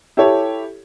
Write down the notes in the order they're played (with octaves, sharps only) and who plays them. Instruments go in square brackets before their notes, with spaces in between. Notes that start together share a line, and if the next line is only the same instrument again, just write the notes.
[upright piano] E4 G4 A4 C#5